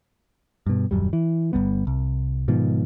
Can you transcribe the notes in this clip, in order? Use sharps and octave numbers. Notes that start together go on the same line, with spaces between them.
G2 B2
D#1 F#2 G3
E3
G1 F#2 G3 B3
C2
G#2 B2 D#3 F3